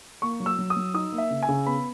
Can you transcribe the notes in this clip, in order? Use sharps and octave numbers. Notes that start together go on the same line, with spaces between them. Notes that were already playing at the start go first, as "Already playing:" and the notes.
A#3 C#6
F#3
E6
F#3
D#6
F#3
D#4 D#6
A#3
E5
C#3
G#5
C#3
B3 B5